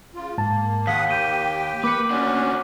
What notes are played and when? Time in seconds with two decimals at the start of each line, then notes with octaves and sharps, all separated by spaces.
0.14 C#3 F4
0.38 G#2 A#3 A5
0.87 D#2 F5 F#5 D#6 B6
1.09 G4 G5 G6 D#7 G7
1.84 A#3 B4 D6 C#7
2.11 C#4 D4 F#4